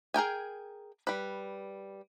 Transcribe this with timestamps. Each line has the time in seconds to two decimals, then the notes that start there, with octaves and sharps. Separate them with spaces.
0.14 G#4 A#4 G5 G#5
1.07 G3 B4